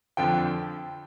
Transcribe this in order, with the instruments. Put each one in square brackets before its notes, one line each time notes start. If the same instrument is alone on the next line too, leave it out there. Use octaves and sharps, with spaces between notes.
[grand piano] F2 D3 F3 G5